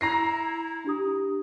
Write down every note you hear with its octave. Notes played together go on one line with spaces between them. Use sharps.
E4 A#5 A#6 C7
D4 G4 D#6